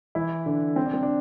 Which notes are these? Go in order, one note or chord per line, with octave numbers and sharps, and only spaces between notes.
E3 E4
D3 D4
C4
D4
C4
D4